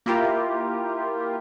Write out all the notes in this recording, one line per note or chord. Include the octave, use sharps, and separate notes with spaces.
A#3 E4 F4 G4 A#4